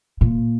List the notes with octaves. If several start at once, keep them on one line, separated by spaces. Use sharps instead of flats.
A#2